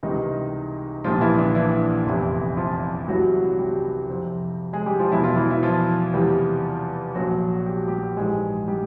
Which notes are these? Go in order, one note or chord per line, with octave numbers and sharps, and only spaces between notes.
C#2 C3 D#3 E3 G3 D#4
A#1 A#2 F3 G3 F4
E3 E4
D3 D4
E3 E4
F1 E2 C3 E3
F3 F4
C2 C3 E3 F#3 G3 F#4
G3 G4
F2 C3 F3
G#3 G#4
G3 G4
F3 F4
E2 B2 F#3 E4
F4
E3 E4
E4
F3 F4
E2 C3 E3 G3
A#1 A#2 F3 F#3 F#4
G4
F#4
G3 G4
A#1 G#2 E3 G3 G#3 G#4
G3 G4